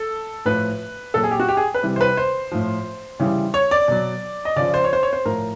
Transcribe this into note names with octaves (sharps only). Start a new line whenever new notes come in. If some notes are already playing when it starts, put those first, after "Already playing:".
Already playing: A4
A2 F3 B4
A#2 F#3 A4
G#4
G4
F#4
G4
G#4
B4
C3 E3 G3
C5
B4
C5
A2 F3
C#3 E3 G3
C#5
D5
B2 F#3
D#5
C#3 F3 D5
C5
C#5
C5
C#5
C5
A2 F3 A#4